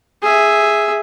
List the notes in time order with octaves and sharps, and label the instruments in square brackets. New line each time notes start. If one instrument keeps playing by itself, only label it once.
[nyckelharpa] G#4 E5